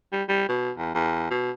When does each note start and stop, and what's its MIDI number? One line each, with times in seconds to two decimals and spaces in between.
0.12 0.23 55
0.29 0.45 55
0.49 0.71 47
0.78 0.93 40
0.95 1.27 40
1.30 1.51 47